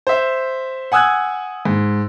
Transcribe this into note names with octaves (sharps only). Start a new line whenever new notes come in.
C5 E5
F#5 G#5 D#6 E6 F#6 G#6
G#2